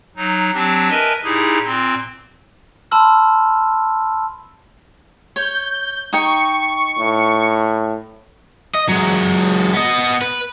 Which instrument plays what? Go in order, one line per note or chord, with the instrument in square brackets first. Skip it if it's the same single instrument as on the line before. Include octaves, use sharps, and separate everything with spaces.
[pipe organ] F#3 D#4
F#3 C4 D4 G4
A#4 B4 D#5 E5 G#5 A5
A#2 D#4 E4 G4 G#4
A#2 C4 C6
[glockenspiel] A5 B5 C6 E6 F6
[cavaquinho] C#5 [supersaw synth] G6
[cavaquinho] D#4 G5 [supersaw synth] C#6
[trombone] A2
[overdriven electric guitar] D#5
F#3 G#3
B3 D#5
B4